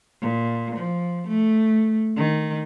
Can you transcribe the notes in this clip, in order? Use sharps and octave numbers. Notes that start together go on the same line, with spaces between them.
A#2
F3
A3
D#3